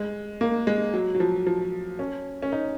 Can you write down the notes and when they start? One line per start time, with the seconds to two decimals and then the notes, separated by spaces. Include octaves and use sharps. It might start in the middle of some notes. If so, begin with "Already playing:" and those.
Already playing: G#3
0.41 A#3
0.67 G#3
0.94 F#3
1.15 F#3
1.20 F3
1.47 F3
1.99 C#4
2.42 C#4
2.52 D#4